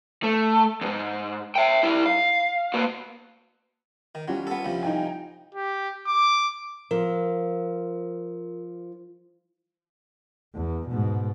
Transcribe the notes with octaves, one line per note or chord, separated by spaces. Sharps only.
A3
E2 G#2
E5 G5
G3 E4
F5
A#3 F#4
D#3
F#3 G3 C#4 F4
B3 A4
C2 F3
D#4 G5 G#5
G4
D6
F3 A#4
E2
G#2 B2